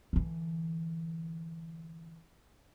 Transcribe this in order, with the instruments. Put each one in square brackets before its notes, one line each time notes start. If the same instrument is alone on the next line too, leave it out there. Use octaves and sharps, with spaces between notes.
[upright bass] D3 E3